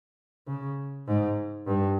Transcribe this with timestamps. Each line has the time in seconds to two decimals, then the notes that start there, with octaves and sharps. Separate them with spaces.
0.47 C#3
1.07 G#2
1.67 G2